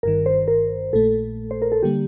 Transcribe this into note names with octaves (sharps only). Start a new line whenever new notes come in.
G1 G2 D#3 A#4
C5
A#4
A#1 A#2 A3 A4
C5
A#4
A4
D3 G3 A#3 G4